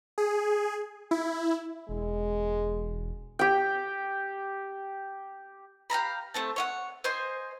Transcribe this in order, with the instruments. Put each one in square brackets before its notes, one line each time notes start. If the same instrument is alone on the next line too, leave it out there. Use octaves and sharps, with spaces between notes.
[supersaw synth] G#4
E4
[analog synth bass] E1 [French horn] G#3
[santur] G4 G5
[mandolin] G4 F5 A#5 B5
A3 C4 A5
C#5 F5 F#5
C5 D#5 G#5 C6